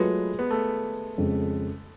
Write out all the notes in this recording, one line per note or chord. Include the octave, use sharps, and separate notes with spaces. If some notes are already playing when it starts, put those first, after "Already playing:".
Already playing: F#3 G#3 A3 F4 B4
B3
A3
F2 C#3 G#3